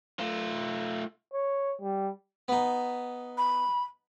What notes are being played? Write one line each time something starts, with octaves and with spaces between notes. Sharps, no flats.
A3 F4
C#5
G3
B3 D#4
B5